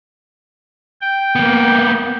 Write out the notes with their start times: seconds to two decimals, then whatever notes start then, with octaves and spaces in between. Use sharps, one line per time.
1.01 G5
1.36 A#3 B3